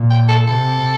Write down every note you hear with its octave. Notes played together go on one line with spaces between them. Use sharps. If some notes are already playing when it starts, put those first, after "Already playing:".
Already playing: A#2
G5
A4
C3 A4